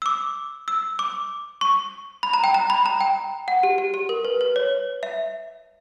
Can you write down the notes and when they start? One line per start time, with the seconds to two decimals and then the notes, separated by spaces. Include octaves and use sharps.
0.02 E6
0.06 D6
0.68 E6
0.99 D6
1.61 C#6
2.23 B5
2.33 A#5
2.44 G5
2.54 A#5
2.70 B5
2.86 A#5
3.01 G5
3.48 F#5
3.63 G4
3.78 G4
3.94 G4
4.09 A#4
4.25 B4
4.41 B4
4.56 C#5
5.03 E5